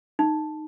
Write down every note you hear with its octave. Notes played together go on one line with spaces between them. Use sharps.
D#4